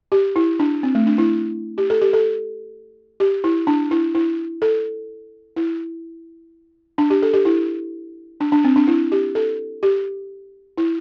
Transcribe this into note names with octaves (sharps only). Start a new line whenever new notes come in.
G4
E4
D4
C4
A3
D4
E4
G4
A4
G4
A4
G4
E4
D4
E4
E4
A4
E4
D4
G4
A4
G4
E4
D4
D4
C4
D4
E4
G4
A4
G4
E4